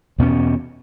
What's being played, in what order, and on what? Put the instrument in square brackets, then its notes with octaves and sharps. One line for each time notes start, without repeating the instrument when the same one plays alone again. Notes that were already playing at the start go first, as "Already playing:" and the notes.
[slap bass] E2 B2 A3 C#4